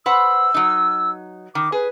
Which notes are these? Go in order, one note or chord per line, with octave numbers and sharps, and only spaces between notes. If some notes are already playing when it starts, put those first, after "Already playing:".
B4 C5 F#5 E6
F#3 D#4
D#3 D6
G#4 B4